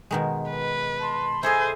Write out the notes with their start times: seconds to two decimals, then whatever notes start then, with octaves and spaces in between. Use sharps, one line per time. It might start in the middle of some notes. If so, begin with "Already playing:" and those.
0.11 B2 D#3 G#3
0.51 B4
0.99 A5 B5 C6
1.43 E4 G#4 A4 C5 D#5 G#5 G#6